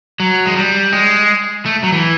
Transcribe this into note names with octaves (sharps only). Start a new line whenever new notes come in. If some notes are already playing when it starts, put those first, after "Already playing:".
F#3
G#3
G3
G#3
A3
F#3
E3